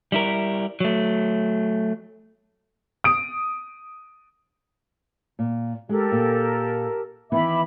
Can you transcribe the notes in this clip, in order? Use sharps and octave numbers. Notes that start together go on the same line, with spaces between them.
G3 E4 A#4
F#3 A3
D#6 D7
A#2
G#3 G4 A4 A#4
A#2
D#3 E3 B3 E5 B5 D6